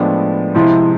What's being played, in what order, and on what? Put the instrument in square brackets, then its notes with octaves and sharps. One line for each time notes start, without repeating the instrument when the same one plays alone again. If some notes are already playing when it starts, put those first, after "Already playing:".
Already playing: [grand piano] A2 F3 G#3 B3 D4
[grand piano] C3 F3 G#3 C4 F4 [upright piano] E4